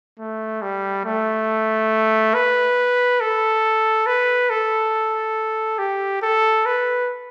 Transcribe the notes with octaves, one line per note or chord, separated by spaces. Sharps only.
A3
G3
A3
B4
A4
B4
A4
G4
A4
B4